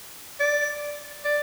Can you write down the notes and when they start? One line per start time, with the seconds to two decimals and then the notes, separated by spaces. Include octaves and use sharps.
0.40 D5
1.25 D5